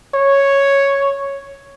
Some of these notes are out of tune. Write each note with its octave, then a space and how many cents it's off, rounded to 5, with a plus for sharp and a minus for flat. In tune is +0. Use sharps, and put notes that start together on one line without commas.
C#5 +0